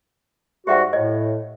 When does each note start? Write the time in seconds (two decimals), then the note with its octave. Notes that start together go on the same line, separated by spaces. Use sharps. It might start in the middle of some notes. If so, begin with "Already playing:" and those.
0.67 G#2 G3 F#4 G4 E5 F#5
0.93 A2 D#5